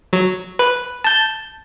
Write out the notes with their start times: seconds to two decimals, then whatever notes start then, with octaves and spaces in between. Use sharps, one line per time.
0.13 F#3
0.59 B4
1.04 A5 G6